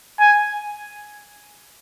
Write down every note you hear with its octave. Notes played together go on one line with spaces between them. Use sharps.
G#5